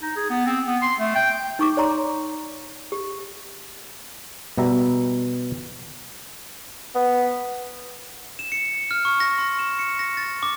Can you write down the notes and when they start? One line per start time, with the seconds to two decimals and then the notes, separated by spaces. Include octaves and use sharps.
0.02 D#4
0.16 G#4
0.30 B3
0.46 C4
0.67 B3
0.82 C6
1.00 A3
1.15 G5
1.59 D#4 C#6 D6
1.77 C#5 D5 A#5 C6
2.92 G4
4.58 B2 G3 E5 A#5
6.95 B3
8.39 E7
8.52 C#7
8.91 F6
9.05 C#6
9.20 A#6
9.38 C6
9.59 E7
9.79 C#7
9.99 A#6
10.17 A6
10.43 D6